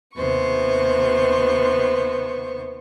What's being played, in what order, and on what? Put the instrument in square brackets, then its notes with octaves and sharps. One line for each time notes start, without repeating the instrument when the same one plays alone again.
[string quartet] D#2 C3 B3 C5 C#6